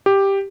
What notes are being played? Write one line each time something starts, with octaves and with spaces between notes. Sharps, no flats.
G4